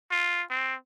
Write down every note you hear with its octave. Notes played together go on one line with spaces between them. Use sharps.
F4
C4